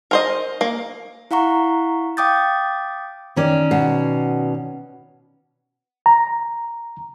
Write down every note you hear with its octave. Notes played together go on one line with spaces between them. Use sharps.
A#4 C5 D#5
A#3
E4 F5 F#5 A#5 C#6
F5 G5 D6 D#6 G6 A6
D#3 C#4 D5
B2
A#5